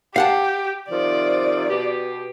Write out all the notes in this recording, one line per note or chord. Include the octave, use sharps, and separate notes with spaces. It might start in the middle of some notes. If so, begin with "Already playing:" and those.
G4 F5 F#5 A5
C3 D#3 F3 D5
B2 G4